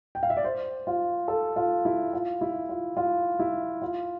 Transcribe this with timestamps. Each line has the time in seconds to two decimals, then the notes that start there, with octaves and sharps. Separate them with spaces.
0.15 G5
0.23 F5
0.30 E5
0.37 D5
0.44 C5
0.87 F4
1.28 A4
1.56 F4
1.85 E4
2.13 F4
2.41 E4
2.69 F4
2.97 F4
3.39 E4
3.82 F4